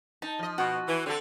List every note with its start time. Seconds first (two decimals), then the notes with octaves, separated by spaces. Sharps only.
0.22 D#4 A5
0.39 F3 D#5
0.58 B2 F#4 C#6
0.88 E3
1.06 D3 C4 A4